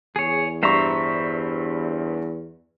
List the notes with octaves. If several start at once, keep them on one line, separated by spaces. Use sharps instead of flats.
E2 G#4 C#5
G2 C5 E5 A#5 C#6